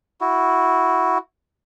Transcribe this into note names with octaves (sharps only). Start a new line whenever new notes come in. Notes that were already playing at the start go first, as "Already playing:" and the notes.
E4 F#4